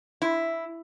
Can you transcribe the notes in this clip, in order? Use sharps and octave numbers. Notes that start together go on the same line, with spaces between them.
E4